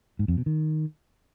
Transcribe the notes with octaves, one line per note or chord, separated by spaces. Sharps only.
G#2
F2
B2
D#3